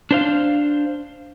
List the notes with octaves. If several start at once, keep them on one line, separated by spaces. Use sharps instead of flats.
D4 C5 F5